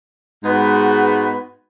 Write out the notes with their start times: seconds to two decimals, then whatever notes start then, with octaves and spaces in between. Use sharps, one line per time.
0.43 G#2 G#3 B3 F#4 B4